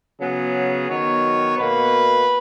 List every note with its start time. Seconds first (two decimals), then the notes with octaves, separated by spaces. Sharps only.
0.19 C#3 F#3 B3 G#4
0.88 D#3 F#3 B3 C#5
1.56 B2 A#3 B4